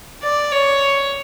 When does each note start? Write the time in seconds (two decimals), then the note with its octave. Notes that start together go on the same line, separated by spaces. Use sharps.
0.23 D5
0.53 C#5